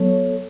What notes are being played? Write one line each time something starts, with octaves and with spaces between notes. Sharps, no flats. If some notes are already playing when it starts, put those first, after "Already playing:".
Already playing: F#3 B3 A4 C#5